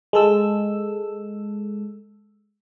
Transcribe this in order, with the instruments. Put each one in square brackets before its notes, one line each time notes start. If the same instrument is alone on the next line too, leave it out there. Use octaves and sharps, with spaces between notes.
[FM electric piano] G#3 A4 E6